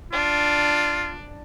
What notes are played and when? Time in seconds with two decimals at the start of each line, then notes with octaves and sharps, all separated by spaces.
0.12 D4 F4